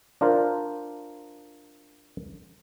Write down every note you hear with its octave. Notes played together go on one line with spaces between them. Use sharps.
D4 F4 A#4 C5